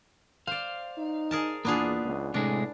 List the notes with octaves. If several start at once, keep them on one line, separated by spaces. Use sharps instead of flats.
C5 D5 F5
D#4
G#4 A#4 A5
E2 A#3 B3 D4 F4 G#4
C#2
A2 C3 G#3 D4 G#4